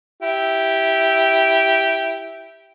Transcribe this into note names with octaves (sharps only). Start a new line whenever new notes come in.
E4 G4